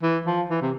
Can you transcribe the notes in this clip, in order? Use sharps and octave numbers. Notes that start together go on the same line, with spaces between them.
E3
F3
E3
C3